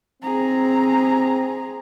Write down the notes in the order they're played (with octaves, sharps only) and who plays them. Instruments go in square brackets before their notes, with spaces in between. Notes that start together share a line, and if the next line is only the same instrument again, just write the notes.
[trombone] C4 [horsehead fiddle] G#4 A#5